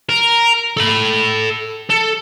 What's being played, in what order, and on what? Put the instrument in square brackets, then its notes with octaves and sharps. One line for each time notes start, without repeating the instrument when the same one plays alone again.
[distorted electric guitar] A#4
A4 B5
A4